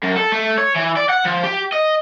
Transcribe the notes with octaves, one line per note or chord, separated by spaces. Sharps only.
F#2
A4
A3
C#5
E3
D5
F#5
F3
G4
D#5